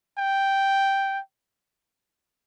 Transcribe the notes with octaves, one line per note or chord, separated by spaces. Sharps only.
G5